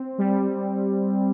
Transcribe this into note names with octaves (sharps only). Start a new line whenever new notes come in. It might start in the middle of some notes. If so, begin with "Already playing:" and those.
Already playing: C4
G3